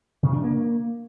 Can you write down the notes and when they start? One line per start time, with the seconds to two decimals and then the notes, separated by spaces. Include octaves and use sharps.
0.23 C3
0.33 D4
0.44 A#3